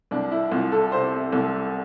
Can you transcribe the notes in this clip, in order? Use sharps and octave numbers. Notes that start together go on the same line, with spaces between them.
C2 D4
E4
C2 F4
A4
C3 C5
C2